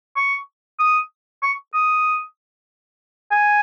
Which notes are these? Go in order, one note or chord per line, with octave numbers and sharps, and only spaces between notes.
C#6
D#6
C#6
D#6
G#5